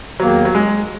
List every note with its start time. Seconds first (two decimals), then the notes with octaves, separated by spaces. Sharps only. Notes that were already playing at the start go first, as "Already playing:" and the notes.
0.20 E2 D#3 F#3 A#3
0.45 F#3
0.55 G#3